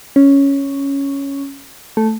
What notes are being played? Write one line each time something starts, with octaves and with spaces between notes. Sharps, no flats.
C#4
A3